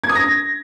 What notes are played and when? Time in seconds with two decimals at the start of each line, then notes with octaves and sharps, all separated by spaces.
0.04 G#6
0.09 D#6
0.15 A#6